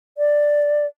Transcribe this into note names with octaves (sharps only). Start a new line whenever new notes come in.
D5